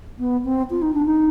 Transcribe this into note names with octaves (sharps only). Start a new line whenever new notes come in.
B3
C4
F4
D#4
D4
D#4